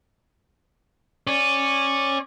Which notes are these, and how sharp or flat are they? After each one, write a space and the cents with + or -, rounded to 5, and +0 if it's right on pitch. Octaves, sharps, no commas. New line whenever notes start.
C#4 -15 D5 +0